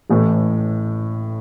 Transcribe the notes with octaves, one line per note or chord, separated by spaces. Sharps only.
A1 A2 E3 A3